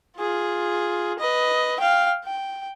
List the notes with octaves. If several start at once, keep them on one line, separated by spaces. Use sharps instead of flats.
F4 G#4
B4 D#5
F5 G5
G5